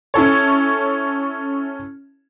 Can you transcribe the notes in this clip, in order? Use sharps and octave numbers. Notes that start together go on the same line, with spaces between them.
C#4 E4 A4 C#5